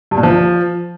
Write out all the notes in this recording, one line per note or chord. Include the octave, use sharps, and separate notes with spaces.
G2
A#2
F3